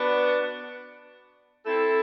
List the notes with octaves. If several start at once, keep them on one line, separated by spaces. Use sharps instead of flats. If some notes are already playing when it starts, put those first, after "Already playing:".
Already playing: B3 D4 F#4 B4
C4 E4 A4